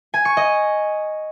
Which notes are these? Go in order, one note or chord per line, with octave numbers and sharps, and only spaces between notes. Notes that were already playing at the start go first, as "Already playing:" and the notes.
G#5
C#6
D#5